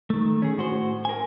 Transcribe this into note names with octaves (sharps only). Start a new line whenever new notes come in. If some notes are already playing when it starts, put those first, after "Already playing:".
D#3 A3
C#4 G#4
A2 F#4 C5
A#4 G#5